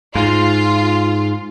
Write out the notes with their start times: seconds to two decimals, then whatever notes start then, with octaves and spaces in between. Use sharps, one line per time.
0.15 G#2 F4